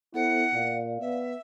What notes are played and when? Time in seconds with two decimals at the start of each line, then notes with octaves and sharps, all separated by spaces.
0.14 B3 E4 A4 C5 F#5
0.55 A#2 D5 F5
1.00 B3 E5